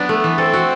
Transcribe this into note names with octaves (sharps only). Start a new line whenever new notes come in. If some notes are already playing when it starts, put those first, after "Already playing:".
Already playing: F#3 B3 D4
A3
E3
C4 A4
F#4